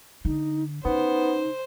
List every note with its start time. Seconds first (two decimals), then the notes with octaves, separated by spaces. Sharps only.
0.25 D3 D#4
0.85 C#3 B3 D#4 C5